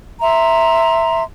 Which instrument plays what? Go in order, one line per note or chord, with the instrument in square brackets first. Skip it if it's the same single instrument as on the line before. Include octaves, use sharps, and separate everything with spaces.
[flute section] E5 A#5 C6